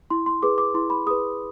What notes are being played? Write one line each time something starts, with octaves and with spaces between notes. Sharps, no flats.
E4 C6
C6
G#4 B4 D6
D6
E4 C6
B5
G#4 B4 D#6